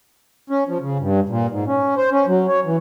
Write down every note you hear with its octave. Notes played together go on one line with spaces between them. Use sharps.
C#4
F3
C#3
G2
A#2
G#2
C#4
C5
C#4
F#3
C#5
E3